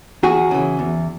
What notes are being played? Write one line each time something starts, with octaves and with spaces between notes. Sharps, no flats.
E2 F#4 G#4
C#3 E3
E2